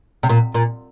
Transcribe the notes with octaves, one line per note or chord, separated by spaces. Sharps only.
C3
A#2
A#2